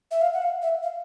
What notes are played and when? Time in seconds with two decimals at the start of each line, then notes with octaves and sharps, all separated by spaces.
0.11 E5
0.21 F5
0.33 F#5
0.42 F5
0.62 E5
0.83 F5